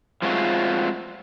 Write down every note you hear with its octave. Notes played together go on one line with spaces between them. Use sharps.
F3 G#3 A3 C4 F4 F#4